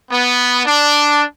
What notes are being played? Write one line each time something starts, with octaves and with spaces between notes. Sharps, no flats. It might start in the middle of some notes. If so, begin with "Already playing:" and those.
B3
D4